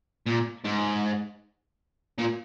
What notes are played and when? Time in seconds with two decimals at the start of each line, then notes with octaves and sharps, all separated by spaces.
0.26 A#2
0.64 G#2
2.18 A#2